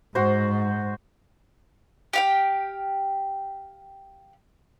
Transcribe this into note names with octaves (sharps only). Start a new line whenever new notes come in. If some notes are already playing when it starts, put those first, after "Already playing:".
G#2 F#4 C5
G4 F5 G5